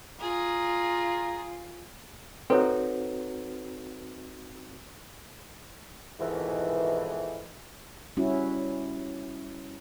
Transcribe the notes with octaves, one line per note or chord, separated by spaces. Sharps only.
F4 G#4 A#5
C4 D#4 F#4 A4 B4 C#5
F2 G#2 B2 D#3 E3
G3 C#4 E4 F#4